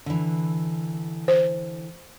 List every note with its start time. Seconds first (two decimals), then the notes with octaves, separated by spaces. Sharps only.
0.06 D3 E3
1.28 C5